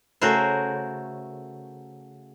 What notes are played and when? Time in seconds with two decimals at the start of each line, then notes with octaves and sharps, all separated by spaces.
0.21 C#3 A3 F#4 A#4 C5